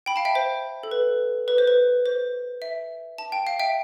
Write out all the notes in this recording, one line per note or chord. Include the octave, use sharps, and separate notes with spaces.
G5 B5
F5 A5
E5 G5
C5
A4
B4
B4
C5
B4
C5
E5
A5
G5
F5
E5 G5